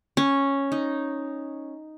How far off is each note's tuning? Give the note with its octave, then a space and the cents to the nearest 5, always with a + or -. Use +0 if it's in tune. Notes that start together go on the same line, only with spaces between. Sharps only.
C#4 -5
D#4 +0